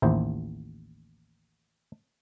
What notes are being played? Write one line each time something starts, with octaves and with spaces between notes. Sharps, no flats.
A1 D#2 E4 C5